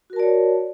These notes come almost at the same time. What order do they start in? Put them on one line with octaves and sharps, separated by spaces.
F#4 A#4 A5 D5 C#5